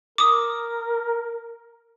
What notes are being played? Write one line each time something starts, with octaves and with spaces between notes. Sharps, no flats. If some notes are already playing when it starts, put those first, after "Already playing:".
A#4 D6 D#6